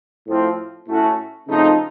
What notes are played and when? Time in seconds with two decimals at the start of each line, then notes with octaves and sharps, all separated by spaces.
0.26 A2 F3 C4 F4
0.86 A2 A3 C#4 F#4
1.47 F2 C#3 F3 A3 D#4